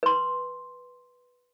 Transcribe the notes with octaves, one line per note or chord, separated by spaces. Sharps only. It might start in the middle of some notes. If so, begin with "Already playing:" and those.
B4 C6